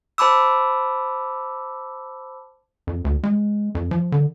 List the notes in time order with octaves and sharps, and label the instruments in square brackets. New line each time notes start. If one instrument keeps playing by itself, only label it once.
[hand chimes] C5 A5 B5 D6 E6
[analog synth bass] F2
D2
G#3
F2
F3
D3